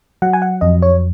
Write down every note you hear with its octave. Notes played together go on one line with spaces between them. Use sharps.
F#3 F#5
G#5
F#5
F2 D#5
C#5